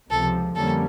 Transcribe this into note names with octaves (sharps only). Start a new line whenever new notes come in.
C#2 C3 F3 A4
F2 D3 G3 A#3 C#4 A4